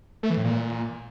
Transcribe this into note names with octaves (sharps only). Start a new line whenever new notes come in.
A3
E3
A2
A#2